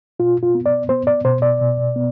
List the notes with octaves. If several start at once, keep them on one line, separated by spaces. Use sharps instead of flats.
B2 F4
F4
B3
D5
B3 C5
D5
B2 C5
D5
B2
B3